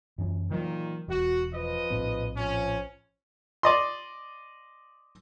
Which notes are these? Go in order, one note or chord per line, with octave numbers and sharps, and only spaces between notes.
F#2 E3 C#4
A#2 D#3 E3 F#3
E1 F#4
F3 B4 D#5
A#1 A2 C4
F3 C#4
D5 D#5 C6